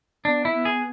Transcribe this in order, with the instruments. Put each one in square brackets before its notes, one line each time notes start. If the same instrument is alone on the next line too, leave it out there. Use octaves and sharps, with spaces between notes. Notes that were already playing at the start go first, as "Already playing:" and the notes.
[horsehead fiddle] B3 [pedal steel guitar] D4
[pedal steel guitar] E4
[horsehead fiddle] B3
[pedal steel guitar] G#4